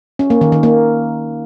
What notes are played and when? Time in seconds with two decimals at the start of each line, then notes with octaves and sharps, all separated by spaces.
0.19 C#4
0.30 A#3
0.41 D#3
0.52 D#3
0.63 A#3